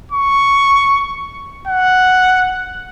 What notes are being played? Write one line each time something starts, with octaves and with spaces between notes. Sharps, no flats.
C#6
F#5